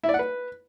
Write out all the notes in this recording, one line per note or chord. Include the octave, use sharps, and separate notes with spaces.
E4
D5
F#5
B4